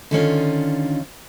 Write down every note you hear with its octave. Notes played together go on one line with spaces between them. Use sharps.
D3 D#3 C#4 F4